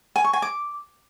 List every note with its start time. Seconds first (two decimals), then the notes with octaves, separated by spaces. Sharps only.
0.16 G#5
0.24 C#6
0.33 G#5
0.42 D6